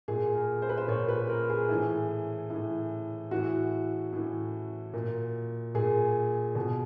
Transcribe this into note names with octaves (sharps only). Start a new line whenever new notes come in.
A#2 G#4
A#4
C5
B4
C5
A#2 C#5
B4
A#4
G#4
A2 E3
A2 E3
A2 E3 F#4
A2 E3
A#2
A#2 G#4
B2